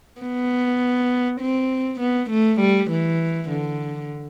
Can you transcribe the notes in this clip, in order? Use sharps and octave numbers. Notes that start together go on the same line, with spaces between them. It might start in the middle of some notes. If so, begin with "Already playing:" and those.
B3
C4
B3
A3
G3
E3
D3